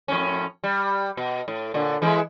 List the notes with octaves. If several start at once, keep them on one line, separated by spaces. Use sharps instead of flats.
F2 A2 C#4
G3
B2
A2
A#2 D3
E3 G#3 E4